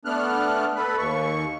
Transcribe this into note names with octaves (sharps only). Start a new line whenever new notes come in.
A3 B3 D4 F6 F#6
A4 B4 B5
D#2 C#6